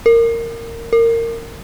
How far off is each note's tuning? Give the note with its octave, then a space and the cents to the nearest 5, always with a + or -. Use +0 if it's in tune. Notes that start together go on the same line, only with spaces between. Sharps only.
A#4 -15
A#4 -20